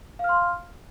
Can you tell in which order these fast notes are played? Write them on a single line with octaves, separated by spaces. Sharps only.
F5 F6 C6